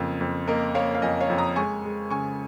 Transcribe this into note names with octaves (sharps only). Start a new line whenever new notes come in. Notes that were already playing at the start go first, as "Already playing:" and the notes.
Already playing: F2 C#3 A#3 F4
F2
A#3 A#4 D#5
A#3 C#5 F5
F5
F2 D#5 G#5
C#5 F5
F2
A#5 D#6
G#3 G#5 C#6
G#3
C#3 G#5 C#6